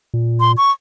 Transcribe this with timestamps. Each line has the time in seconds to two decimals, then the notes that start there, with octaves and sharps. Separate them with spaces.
0.14 A#2
0.40 C6
0.57 C#6